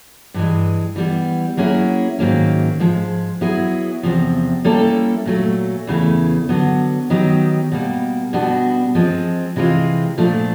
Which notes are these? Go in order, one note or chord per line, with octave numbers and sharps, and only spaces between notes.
G2 E3 G#3
E3 G3 B3
F#3 A#3 C#4 E4 G#4
G#2 D#3 F#3 A#3 C#4
G#2 F3 G#3
F#3 B3 E4 G#4
E2 C3 F3
G3 A#3 C#4 E4 A4
A#2 F#3 A3
E2 C#3 E3 A3
D3 F#3 B3
D#3 F#3 B3 D#4 G4
B2 G3 A#3
B2 G3 B3 D4 F#4
F3 G#3 C4
C3 E3 G#3 C4 F4
A#2 F3 A3 D4